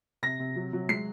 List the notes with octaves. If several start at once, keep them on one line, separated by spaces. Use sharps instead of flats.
C3 A#6
C3
F#3
F#3
G#3 C7